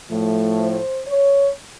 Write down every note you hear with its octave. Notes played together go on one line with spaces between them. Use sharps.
A2 F3 A3
C5
C#5